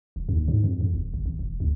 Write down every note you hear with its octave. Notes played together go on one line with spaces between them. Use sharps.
D#1
D#2
G#2
F2
E2
E1
G1
G#1
E1
D2